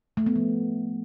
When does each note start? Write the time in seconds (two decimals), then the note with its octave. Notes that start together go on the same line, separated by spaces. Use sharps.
0.17 A3
0.26 B3
0.36 F3